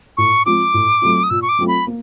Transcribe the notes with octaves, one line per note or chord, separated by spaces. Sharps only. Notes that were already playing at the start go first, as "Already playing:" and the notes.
A2 C#6
F3 G#3 C4 F4 D6
A2
F#3 A3 C4 F4
D#6
A#2 E6
C#6
D6
F#3 A3 C4 F4
B5
A#3